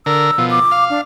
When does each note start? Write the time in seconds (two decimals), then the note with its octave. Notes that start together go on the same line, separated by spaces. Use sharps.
0.06 D3 A#4 E6
0.38 B2 F3
0.51 D6
0.71 F5
0.90 D4